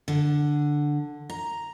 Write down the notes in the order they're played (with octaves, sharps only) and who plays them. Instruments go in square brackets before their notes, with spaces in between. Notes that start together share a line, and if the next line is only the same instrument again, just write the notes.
[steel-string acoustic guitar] D3
A#5